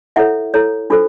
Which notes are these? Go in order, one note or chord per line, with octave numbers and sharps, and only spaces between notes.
E4 A4 C#5 E5 F#5
E4 A4 C#5
D4 F4 A4 C5